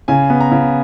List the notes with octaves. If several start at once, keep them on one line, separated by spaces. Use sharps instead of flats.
C#3 G#5
B3
A#5
C#3